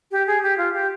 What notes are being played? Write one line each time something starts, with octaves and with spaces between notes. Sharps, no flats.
G4
G#4
G4
F4
G4